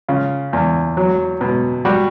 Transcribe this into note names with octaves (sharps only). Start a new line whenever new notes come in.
C#3 F4
E2
F#3
B2
G3 F#4